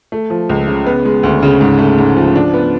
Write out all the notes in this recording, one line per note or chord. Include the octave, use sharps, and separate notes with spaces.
A3
F3
C#2
C#3
B3
G#3
D2
C#3
G#2
A3
G#2
F3
D4
B3